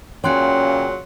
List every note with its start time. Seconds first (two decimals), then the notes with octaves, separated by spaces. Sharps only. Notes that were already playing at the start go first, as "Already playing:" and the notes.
0.24 A#2 C#3 F#3 C#4 C#5 G5 C6 F#6